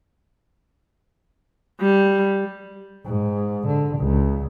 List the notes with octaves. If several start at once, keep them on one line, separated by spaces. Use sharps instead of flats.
G3
G#2
D3
C#2